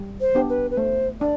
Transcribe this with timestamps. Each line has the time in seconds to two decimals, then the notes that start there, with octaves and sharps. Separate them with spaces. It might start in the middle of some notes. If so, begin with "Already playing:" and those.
Already playing: G3
0.21 C5
0.35 B3 D4 G4
0.49 B4
0.71 B4
0.77 A3 C5
1.21 D4 D5